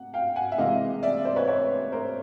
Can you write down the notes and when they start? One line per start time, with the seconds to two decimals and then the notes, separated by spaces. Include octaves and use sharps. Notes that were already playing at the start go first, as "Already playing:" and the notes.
Already playing: C3 F#5
0.14 F5 G5
0.36 F#5 G#5
0.52 E5
0.58 C3 E3 G#3 D#5 F5
1.03 D5 E5
1.25 C5 D5
1.36 B4 C#5
1.48 B4 C#5
1.92 A#4 C5